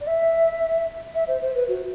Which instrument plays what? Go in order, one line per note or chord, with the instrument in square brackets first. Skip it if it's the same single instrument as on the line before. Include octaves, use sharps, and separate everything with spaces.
[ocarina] D5
E5
E5
C5
C5
B4
F#4